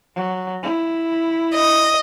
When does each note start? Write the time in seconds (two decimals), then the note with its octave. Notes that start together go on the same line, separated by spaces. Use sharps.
0.15 F#3
0.63 E4
1.54 D#5